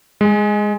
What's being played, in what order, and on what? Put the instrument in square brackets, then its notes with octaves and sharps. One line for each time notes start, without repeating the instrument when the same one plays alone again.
[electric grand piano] G#3